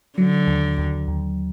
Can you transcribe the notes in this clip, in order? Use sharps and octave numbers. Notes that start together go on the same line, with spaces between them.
D3 F#3
D#2
D#2
D#2